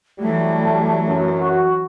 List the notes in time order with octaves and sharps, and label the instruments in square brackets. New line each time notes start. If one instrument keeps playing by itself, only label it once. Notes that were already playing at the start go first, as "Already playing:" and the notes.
[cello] E3 F#3 [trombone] G3 [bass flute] A3
[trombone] F#2
[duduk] F#4